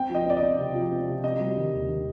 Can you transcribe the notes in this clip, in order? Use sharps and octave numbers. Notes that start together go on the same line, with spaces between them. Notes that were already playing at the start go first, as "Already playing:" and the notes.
Already playing: C4 G5
F3 D#5
C4 D5
D#5
C4
C3
F3
C4
C3
C4 D#5
G3
D#3
D#2
D#3